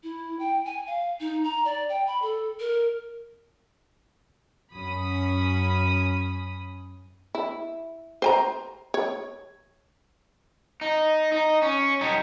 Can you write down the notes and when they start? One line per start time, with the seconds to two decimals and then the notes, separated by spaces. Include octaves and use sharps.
0.03 E4
0.39 G5
0.65 G#5
0.87 F5
1.20 D#4
1.44 A#5
1.65 D5
1.89 G5
2.07 B5
2.22 A4
2.60 A#4
4.73 F#2 C#4 B5 D#6
7.35 E4
8.22 C5 G#5 A#5
8.94 C#5
10.81 D#4
11.32 D#4
11.62 C#4
12.01 G3 D#4